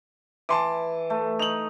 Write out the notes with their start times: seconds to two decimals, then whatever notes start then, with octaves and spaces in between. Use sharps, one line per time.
0.49 E3 A5 C6 D6
1.10 A3
1.39 D#4 F7 F#7